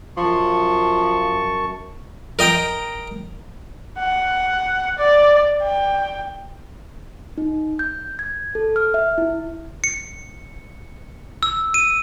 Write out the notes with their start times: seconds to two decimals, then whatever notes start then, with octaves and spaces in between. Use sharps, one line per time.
0.17 F#2 F3 A5 C#6
2.39 A#4 D#5 G5 A#5
3.99 F#5
4.99 D5
5.63 G5
7.38 D#4
7.79 G6
8.19 G#6
8.55 A4
8.76 F6
8.94 E5
9.18 E4
9.84 C#7
11.43 E6
11.74 D#7